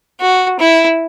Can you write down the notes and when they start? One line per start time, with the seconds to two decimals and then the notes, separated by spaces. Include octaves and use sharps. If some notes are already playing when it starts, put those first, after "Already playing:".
0.20 F#4
0.59 E4